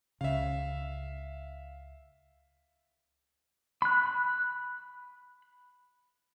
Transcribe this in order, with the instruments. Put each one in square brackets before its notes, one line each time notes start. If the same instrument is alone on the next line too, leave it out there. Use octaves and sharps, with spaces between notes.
[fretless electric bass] C#2 C#3 [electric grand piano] E5 F5
[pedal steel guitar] B5 F#6